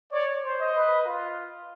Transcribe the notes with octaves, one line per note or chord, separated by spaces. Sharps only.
C#5 D5
C5
D#5
B4
F4